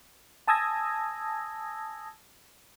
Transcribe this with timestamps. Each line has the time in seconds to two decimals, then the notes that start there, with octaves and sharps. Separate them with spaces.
0.47 G#5 A5 D#6 E6 G#6 A#6